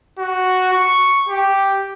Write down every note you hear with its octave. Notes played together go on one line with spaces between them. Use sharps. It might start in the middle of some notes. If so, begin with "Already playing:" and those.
F#4
C#6
G4